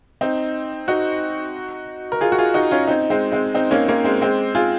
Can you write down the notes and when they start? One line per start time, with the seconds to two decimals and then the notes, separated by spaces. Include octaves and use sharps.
0.21 C4 D#4
0.88 D#4 F#4
2.12 A#4
2.21 F4 G#4
2.32 F#4
2.38 F4 G#4
2.54 D#4 F#4
2.71 C#4 F4
2.88 C4 D#4
3.10 G#3 C4
3.32 G#3 C4
3.55 C4 D#4
3.71 A#3 C#4
3.88 A#3 C#4
4.04 G#3 C4
4.21 G#3 C4
4.55 F4 G#4